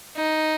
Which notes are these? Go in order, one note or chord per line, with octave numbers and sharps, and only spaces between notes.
D#4